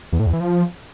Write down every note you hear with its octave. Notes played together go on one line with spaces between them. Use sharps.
E2
A2
E2
E3
F3